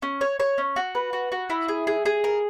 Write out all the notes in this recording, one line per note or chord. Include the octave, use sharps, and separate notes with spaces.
C#4
C#5
C#5
C#4
F#4
B4
F#4
F#4
E4
G#4
G#4
G#4
A#4